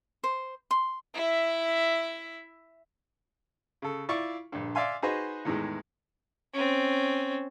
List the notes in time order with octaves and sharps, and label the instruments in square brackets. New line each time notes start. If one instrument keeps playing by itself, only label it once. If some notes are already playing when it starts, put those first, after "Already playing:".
[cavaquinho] C5
C6
[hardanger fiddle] E4 E5
[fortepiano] C#3 A4
E4 F4 D5 F5 C#6
A#1 G2
D5 E5 F5 G#5 C6
D#4 F#4 G#4 B4 C5 D#5
E2 A2 D#3 E3 G#3
[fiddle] C4 C#4